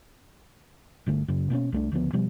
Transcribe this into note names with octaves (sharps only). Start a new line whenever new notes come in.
G1 D3 A3
F#2 C#3
B2 A#3 C4 C#4
C2 A3 D4
D2 C#3 F3 B3
B2 F3 G3